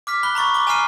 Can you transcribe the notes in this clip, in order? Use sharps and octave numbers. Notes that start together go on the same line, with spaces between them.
D6 F6 B6
B5 F#6 G7
A#5 B5 C#6 A6
D6 G7
G#5 A#5 D6 F6 C7 D#7